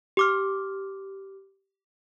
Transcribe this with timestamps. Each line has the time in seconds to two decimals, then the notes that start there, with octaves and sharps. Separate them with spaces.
0.17 G4 D6 F6